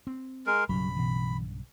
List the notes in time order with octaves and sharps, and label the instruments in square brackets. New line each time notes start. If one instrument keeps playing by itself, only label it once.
[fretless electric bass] C4
[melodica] G#3 A#4
[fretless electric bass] B1 G2 C#3 [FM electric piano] F#3 [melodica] B5
[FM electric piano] B2 E3